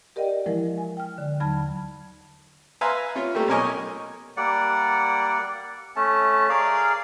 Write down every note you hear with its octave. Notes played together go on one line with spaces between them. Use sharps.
G4 A#4 D5 D#5 F#5 G5
E3 F3 G#3 E4 A#4
G#5
G5 F6
D3
D#2 F#3 A5 B5 F6 G#6
B4 E5 F5 G#5 A#5 C6
C#4 F4
G3 A3 A#3 G4
B1 C#4 A#4 D#5 G#5 C#6
G3 A#3 D5 F#5
A3 C#4 A5
G#4 A#4 D5 F5